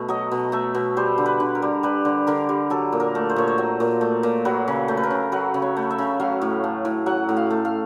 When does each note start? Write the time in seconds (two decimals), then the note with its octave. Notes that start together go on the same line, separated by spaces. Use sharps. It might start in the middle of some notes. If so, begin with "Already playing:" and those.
Already playing: B2 A3
0.08 F#3 D#5
0.31 B2
0.52 A3 E5
0.75 B2
0.97 G3 C5
1.18 D3
1.26 B4
1.40 D3
1.55 A#4
1.62 G3
1.83 G3 B4
2.05 D3
2.27 D3 A#4
2.49 G3
2.70 F#3 A4
2.93 A#2
3.00 A#4
3.15 A3
3.30 C5
3.36 A#2 C#5
3.48 C5
3.58 F#3
3.80 A#2
4.01 A3
4.23 A#2
4.45 F#3 B4
4.68 C#3
4.88 A3
4.97 B4
5.03 A#4
5.11 C#3
5.32 F#3 B4
5.54 C#3
5.62 C#5
5.77 A3
5.91 E5
5.98 C#3
6.20 F#3 F5
6.42 A2
6.64 A3
6.85 A2
7.06 F#3 F#5
7.29 A2
7.37 F5
7.50 A3
7.65 F5